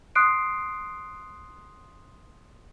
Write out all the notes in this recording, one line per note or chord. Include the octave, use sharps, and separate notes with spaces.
C6 D#6 F#6 C7 D7